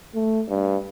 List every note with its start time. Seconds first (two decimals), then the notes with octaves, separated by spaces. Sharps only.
0.15 A3
0.49 G2